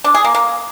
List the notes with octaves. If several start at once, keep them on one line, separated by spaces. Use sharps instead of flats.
D4
G#4
A#3
A#3